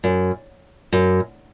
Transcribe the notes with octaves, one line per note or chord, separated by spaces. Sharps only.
F#2
F#2